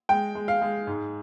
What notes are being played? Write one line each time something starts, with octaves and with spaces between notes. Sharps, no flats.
G#3 G5
G#3
F5
G#3
G#2